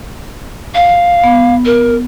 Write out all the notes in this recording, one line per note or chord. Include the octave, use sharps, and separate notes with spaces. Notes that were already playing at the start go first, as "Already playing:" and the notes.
F5
B3
A#4